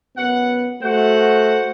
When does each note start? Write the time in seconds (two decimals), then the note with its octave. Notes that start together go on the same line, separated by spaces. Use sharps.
0.18 F#2 B3 F#5
0.82 A3 F#4 C5 F#5